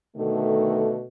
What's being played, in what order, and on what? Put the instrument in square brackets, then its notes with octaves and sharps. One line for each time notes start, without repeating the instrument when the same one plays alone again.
[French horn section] B2 D3 D#3 A3